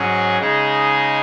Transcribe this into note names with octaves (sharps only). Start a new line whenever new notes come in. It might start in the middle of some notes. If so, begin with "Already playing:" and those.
Already playing: G#2 F#3 C#4 G#4
C#3 G#3 D#4 G#4